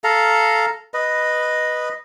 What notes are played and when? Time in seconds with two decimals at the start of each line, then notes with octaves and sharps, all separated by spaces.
0.04 A4 F5 A#5
0.94 B4 D#5